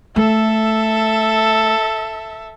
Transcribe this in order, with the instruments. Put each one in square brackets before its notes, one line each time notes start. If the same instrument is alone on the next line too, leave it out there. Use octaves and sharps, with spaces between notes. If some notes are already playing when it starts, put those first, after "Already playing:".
[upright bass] A3 [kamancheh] A4 E5